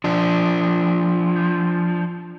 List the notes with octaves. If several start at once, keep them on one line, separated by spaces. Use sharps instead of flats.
F3 D4